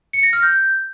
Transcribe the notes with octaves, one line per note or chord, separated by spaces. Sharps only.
C#7
A#6
F6
G6